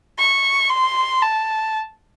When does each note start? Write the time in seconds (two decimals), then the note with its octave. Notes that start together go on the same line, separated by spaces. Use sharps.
0.19 C#6
0.70 C6
1.22 A5